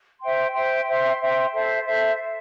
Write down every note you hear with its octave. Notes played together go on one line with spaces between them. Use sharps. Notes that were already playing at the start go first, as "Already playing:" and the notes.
C5 E5 G5 C6
C5 E5 G5 C6
C5 E5 G5 C6
C5 E5 G5 C6
A4 C5 E5
A4 C5 E5